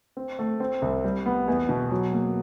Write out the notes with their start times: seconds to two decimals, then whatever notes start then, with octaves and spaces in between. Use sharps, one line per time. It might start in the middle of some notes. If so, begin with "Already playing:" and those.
0.17 C4
0.39 A3
0.60 C4
0.82 C2
1.05 G3
1.26 B3
1.48 E2
1.69 B2
1.91 F#3
2.13 A#3